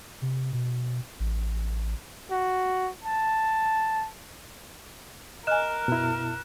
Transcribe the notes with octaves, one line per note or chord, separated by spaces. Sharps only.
C3
B2
A1
F#4
A5
A#4 D#5 G#5 F6 F#6 E7
F#2 B2 E4